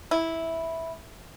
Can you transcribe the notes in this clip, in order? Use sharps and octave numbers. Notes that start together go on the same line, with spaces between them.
E4